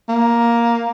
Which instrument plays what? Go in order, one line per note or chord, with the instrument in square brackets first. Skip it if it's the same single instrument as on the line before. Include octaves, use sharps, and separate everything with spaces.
[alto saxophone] A#3